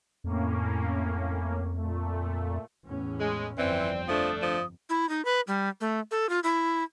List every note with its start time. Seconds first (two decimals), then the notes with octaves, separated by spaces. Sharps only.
0.24 F2 A2 A#3 C#4
1.77 A#2 A3
2.86 E2 A2 C#4
3.18 G#3
3.58 G1 F2 E3 C4 D5
4.08 F3 A3 D4 D#6
4.42 F3 D#6
4.89 E4
5.09 D#4
5.25 B4
5.47 G3
5.81 A3
6.11 A4
6.29 F4
6.43 E4